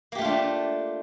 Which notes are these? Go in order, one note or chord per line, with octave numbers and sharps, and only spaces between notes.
A3 A#3 D4 F4 G4